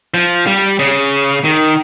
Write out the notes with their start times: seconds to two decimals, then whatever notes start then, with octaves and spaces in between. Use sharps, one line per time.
0.14 F3
0.47 G3
0.79 C#3
1.44 D#3